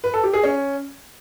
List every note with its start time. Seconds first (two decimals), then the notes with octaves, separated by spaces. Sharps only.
0.04 B4
0.14 A4
0.24 G4
0.33 G#4
0.43 C#4